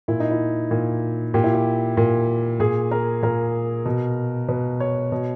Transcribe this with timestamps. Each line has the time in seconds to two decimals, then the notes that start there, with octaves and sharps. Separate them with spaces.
0.08 A#2 E4
0.20 D#4
0.31 E4
0.71 A#2
1.34 A#2 G4
1.44 E4
1.54 G4
1.97 A#2
2.60 A#2 G#4
2.91 A#4
3.23 A#2 A#4
3.85 B2
4.48 B2 B4
4.80 C#5
5.12 B2